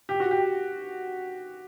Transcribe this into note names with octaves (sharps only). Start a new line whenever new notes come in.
G4
F#4
G4